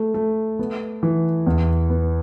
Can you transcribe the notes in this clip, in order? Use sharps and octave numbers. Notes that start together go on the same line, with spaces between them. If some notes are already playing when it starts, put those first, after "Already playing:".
Already playing: A3
A3
B3
E3
E2
B3